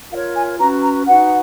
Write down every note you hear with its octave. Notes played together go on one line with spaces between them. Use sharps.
F4 A#4 C#5 F5
G#5
C#4 F#4 B4 A#5
A#5
D#4 F#4 B4 F#5